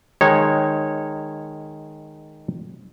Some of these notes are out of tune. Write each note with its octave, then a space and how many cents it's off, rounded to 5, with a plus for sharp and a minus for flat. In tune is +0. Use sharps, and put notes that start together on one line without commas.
D#3 -10 G#3 +0 C#5 -15